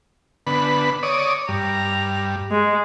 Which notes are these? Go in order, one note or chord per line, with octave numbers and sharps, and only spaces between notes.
D3 B3 B4
C#5 D5 D#6
G2 A#5
G#3